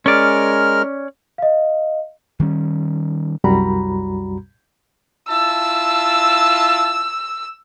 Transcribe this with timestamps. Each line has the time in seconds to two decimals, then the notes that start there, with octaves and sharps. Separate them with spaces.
0.06 G#3 C#4 A#4 D5 F6
1.38 D#5 F5
2.40 D#3 G3 C#4
3.44 C2 F#2 G3 F#4 A#5 B5
5.29 E4 F4 A5 E6